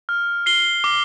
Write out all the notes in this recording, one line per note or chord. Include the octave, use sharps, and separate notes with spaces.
F6
C7 G7
D6